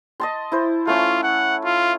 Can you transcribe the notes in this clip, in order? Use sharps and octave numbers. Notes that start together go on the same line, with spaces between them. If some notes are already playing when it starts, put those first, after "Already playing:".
D#5 A5 C6
E4 C5
A3 C#4 F4
F#5
F4